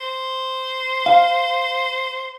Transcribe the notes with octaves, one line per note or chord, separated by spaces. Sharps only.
C5
F5